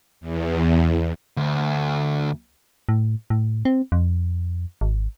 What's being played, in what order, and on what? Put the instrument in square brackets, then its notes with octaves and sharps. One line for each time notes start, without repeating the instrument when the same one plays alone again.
[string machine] E2
[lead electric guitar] D2
[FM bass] A2
A2
C4
F2
G#1